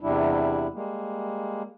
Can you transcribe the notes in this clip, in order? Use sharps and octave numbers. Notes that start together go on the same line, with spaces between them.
E2 C3 G3 D4 E4
G3 G#3 A#3